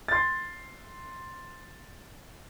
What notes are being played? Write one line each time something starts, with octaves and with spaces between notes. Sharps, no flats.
C6 A6